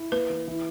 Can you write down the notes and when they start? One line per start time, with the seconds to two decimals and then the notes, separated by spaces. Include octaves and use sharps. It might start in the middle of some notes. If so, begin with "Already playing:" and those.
Already playing: E4
0.12 A#3 B4
0.30 E3
0.48 E3